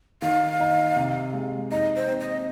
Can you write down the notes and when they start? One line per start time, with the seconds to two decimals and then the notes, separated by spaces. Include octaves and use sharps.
0.22 D#3 F5
0.60 D#4
0.96 C3
1.33 G#3
1.72 D#4 D#5
1.96 C5
2.08 C4
2.20 D#5